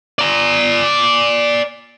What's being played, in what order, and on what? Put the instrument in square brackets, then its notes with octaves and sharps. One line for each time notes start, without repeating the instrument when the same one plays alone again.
[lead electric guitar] D5 A#5